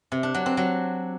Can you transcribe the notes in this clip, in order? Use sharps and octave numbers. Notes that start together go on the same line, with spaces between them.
C3
D4
F#3
C4
F#3